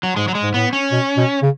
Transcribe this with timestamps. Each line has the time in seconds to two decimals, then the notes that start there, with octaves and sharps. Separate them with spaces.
0.03 F#3
0.16 G#2 G#3
0.28 F#3
0.35 G#3
0.42 G#2
0.54 A2 B3
0.73 C#4
0.92 B2
1.17 B2
1.42 C#3